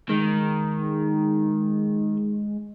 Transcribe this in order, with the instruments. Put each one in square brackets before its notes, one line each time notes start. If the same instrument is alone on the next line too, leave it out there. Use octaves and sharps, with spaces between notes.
[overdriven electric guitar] D#3 [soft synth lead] G#3